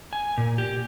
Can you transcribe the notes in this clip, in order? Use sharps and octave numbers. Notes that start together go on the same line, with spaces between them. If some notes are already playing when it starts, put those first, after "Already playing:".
G#5
A#2
G4